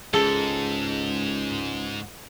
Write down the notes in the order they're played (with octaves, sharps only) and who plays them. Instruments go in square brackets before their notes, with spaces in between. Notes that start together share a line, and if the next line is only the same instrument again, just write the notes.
[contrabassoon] C#2 [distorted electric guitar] G#2 [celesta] G#4 G7 [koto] A4